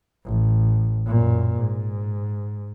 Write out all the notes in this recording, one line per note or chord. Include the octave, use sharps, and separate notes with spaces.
A1
F#2 A#2
G#2